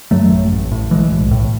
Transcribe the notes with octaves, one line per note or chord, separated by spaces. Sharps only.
F#2 F#3 A3
A1
A1
A2
B1 E3 G#3
B1
A2